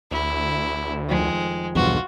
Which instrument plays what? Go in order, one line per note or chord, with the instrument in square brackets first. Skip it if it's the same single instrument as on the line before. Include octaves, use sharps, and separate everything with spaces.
[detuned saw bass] D2 [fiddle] E4
[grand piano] F1 F2 D#3 [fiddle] G#3
[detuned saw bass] B1 [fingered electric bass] E2 G2 B2 [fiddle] F4 F#4